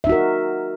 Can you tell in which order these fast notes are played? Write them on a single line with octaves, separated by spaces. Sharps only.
E5 D#4 F#4 A#4